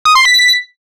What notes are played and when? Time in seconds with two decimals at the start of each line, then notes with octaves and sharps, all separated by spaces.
0.05 D#6
0.15 C6
0.25 B6